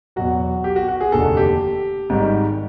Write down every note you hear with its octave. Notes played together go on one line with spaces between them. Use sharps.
E2 B2 F#3 F#4
G4
F#4
F#4
G#4
F1 D#2 D3 A4
G4
G#1 G#2 D#3 G3